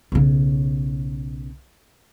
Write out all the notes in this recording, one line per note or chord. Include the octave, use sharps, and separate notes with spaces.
B1 C#3